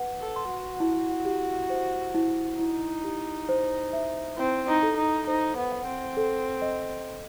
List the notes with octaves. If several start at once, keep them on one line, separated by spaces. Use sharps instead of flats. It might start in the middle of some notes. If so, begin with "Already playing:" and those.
Already playing: B4 F#5
A4
C6
F#4
E4
G4
C5
E4
D#4 E4
G4
C5
E5
C4 E4
D#4
A4
D#4
D#4 C5
B3
F#5
C4
A4
D#5